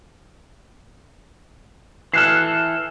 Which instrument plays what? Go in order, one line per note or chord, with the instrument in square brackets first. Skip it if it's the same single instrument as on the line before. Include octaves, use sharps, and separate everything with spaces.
[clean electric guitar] E3 A4 [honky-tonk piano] F6 F#6 C7